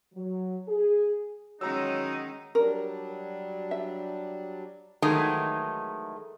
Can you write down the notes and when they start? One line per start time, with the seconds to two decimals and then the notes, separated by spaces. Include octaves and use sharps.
0.13 F#3
0.67 G#4
1.61 D#3 F#3 G#3 C#4 D#4 F#5 A#5 E6
2.55 F#3 G3 D4 A#4
3.71 E5
5.02 D#3 E3 F#3 G#3 A3 D#4